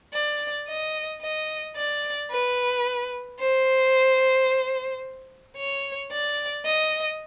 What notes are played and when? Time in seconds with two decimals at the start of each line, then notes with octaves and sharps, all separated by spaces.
0.13 D5
0.67 D#5
1.22 D#5
1.76 D5
2.30 B4
3.39 C5
5.57 C#5
6.11 D5
6.65 D#5